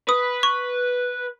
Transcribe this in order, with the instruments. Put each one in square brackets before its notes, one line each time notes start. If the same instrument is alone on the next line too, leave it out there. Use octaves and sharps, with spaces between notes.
[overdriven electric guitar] B4 [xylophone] D#6
[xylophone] C#6